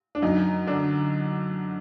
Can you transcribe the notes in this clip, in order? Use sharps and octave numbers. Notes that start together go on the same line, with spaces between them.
D4
F#2 D#4
D3 D4